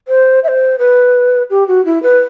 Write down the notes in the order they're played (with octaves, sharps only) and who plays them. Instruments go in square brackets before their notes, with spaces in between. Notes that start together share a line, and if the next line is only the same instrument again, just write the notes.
[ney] C5
E5
C5
B4
G4
F#4
E4
B4